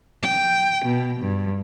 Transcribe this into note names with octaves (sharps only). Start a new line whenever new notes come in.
G5
B2
G2